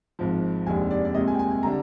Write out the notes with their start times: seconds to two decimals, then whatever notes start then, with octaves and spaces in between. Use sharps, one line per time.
0.19 G#1 G#2 F3
0.66 F1 D#2 D#3 G#3 D4 G#5
0.91 D5
1.05 D5
1.14 C2 A#2 G#3 D#5
1.27 G#5
1.34 G5
1.39 G#5
1.51 G#5
1.63 D3 G3 D4 A#5